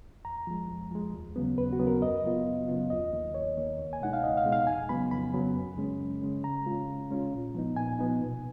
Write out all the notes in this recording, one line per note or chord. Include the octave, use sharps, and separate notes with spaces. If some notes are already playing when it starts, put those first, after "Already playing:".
F2 A#5
F3 G#3
F2
F3 G#3
D#2
C#3 F#3 B3
D#2 B4
F#4
C#3 F#3 B3
A#4
F#2 D#5
C#3 F#3 B3 F4
F#2
C#3 F#3 B3 F4
D#2 D#5
D#3 A#3
D#2 C#5
D#3 A#3
C#2
G#5
B2 G#3 D#4 F#5
F5
C#2 D#5
F5
B2 G#3 D#4
F5
F2 G#5
C#3 F#3 B3 B5
F2 B5
C#3 F#3 B3
F#2
C#3 G#3 C#4
F#2
C#3 G#3 C#4
C#3 A#5
G#3 C#4 F4
C#3
G#3 C#4 F4
A#2
F3 B3 D#4
A#2 G#5
F3 B3 D#4
B2